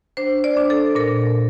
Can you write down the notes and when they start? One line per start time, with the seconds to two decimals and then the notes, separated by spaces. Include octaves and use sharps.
0.17 D4 C5
0.44 D5
0.57 D4
0.70 A4
0.95 A#2 A#4